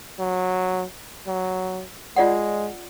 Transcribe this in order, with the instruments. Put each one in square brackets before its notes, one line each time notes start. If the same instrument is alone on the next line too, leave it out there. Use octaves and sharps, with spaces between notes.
[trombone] F#3
F#3
[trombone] G#3 [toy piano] F4 D5 F#5